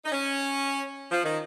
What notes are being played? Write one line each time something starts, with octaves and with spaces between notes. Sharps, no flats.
D#4
C#4
F3
D#3